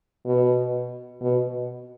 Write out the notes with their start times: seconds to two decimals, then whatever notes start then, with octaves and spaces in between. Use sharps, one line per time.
0.25 B2
1.21 B2